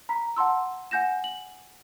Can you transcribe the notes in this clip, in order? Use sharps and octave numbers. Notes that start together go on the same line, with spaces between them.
A#5 B5 B6
F#5 A5 C6 E6
F#5 G#5 G6 A#6 E7
F#7